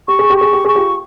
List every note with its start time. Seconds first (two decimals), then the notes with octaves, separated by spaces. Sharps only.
0.08 G4 C#6
0.19 G#4
0.30 G4
0.37 G#4 C#6
0.53 G4
0.65 G#4 C#6
0.75 F4 G4